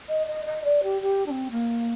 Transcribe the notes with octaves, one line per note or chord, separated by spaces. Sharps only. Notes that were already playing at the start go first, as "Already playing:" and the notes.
D#5
D#5
D#5
D5
G4
G4
D4
C4
A#3